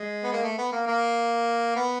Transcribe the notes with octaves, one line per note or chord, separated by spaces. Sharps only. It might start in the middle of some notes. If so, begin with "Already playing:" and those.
Already playing: G#3
B3
A#3
A3
B3
A#3
A#3
B3